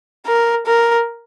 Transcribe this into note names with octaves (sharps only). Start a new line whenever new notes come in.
A#4
A#4